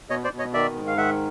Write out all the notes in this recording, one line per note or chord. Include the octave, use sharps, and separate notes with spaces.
B2 C#5 D#5
C5 D5
B2
C#5 D#5
D#3 D5 E5
G#2
F5
D#3 E5 F#5